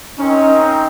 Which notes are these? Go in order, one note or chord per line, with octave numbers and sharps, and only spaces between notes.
C4 C#4 D#4 A#4 D#5